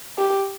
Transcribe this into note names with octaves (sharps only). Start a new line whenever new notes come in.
G4